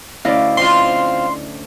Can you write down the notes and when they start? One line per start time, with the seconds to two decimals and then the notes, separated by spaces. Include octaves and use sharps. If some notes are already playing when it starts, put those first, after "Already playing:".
0.25 D2 C#4 E4 D5 D#5 F5
0.57 C4 F4 C6